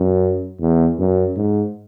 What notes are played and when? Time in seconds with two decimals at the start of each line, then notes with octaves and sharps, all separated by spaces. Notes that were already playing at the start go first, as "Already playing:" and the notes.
Already playing: F#2
0.61 E2
0.99 F#2
1.36 G#2